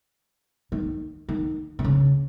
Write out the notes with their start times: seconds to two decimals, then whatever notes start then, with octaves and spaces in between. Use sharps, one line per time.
0.72 D#3
1.29 D#3
1.79 C3
1.84 C#3